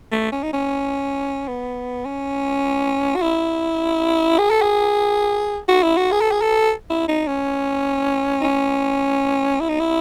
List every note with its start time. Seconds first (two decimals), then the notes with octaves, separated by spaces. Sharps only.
0.12 A3
0.32 C#4
0.43 D#4
0.53 C#4
1.48 B3
2.05 C#4
3.16 F#4
3.22 E4
4.39 G#4
4.50 A4
4.62 G#4
5.68 F#4
5.83 E4
5.97 F#4
6.12 G#4
6.21 A4
6.32 G#4
6.42 A4
6.90 E4
7.08 D#4
7.28 C#4
8.41 D#4
8.44 C#4
9.60 E4
9.69 D#4
9.80 E4